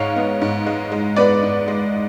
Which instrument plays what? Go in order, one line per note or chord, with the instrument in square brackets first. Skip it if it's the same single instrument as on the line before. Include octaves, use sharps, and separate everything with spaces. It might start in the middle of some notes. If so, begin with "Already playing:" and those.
Already playing: [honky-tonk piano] G#2 G#3 C#5 F5
B3
G#2
G#3
G#3
B3 B4 D5
G#2
G#3